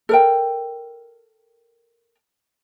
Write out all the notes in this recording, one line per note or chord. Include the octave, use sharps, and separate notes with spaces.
A4 A#4 G5